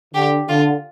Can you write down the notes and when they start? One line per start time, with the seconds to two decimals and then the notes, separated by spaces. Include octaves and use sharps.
0.14 D3 G4
0.48 D3 F4